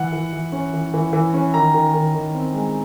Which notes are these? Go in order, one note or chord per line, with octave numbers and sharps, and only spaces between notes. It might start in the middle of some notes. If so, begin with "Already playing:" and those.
Already playing: E3 F#5
E3
E3
C#4
E3
E3
E3
C#4
D#3 A#5
D#3
D#3
D#3
C4
G#3